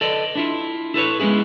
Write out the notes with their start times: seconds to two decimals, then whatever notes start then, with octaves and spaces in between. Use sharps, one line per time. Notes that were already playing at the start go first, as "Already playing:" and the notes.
0.01 A4 B4 D5 D#5
0.35 D4 E4 F4
0.94 E4 A4 B4 C#5
1.20 G#3 B3 C#4 E4 G#4